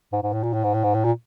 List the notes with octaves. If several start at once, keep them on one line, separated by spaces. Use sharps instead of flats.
G#2
G#2
A2
A#2
A2
G#2
A2
G#2
A2
A#2